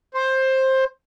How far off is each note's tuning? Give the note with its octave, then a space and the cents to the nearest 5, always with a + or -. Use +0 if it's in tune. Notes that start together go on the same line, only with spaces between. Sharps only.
C5 +15